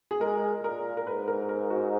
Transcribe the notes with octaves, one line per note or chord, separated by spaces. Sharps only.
G#4
G#3 A#4
A#2 A#4
A#4
G#2 B4
A#4
A#4
F#4